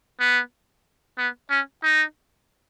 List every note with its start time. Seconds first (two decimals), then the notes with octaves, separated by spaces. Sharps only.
0.20 B3
1.18 B3
1.50 C#4
1.83 D#4